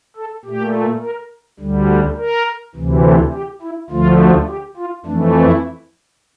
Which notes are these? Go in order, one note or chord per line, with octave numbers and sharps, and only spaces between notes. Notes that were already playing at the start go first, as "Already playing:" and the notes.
A4
A#2 A3 G4
A#4
D2 D3 G3
A#4
D2 C3 E3
A4
G4
E4
D2 D3 F3 A3 F4
G4
F4
F2 E3 A3 D4
E4